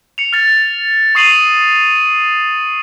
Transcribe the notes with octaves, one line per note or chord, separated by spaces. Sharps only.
C#7 F7
F6 A6
C#6 D#6 C7 D#7 F7 F#7